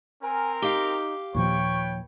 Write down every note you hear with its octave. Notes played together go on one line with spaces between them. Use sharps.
C4 A#4 G#5
D#4 G4 F5
D#2 A#2 F3 B4 C#5 G5 C#6